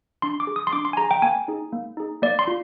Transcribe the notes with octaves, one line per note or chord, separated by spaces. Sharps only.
D4 C6
D6
G#4
D#6
C6
D4 D6
C6
G#5
G#4 A#5
G5
A#3 G#5
D#4 G#4
A#3
D#4 G#4
A#3 D5
C6
F4